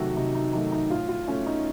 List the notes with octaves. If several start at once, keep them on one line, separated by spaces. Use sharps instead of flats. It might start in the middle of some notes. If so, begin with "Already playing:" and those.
Already playing: C3 D#3 F#3 A3 F#4 A4
C3 D#4
D#4
D#3 F#3 A3 D#4
D#4
A2 F4
F4
A3 C#4
D#4